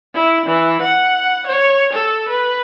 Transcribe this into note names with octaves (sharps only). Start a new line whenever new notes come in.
E4
E3
F#5
C#5
A4
B4